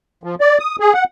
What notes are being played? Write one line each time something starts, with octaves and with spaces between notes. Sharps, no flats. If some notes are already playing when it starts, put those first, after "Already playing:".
F3
D5
D#6
G#4
F#5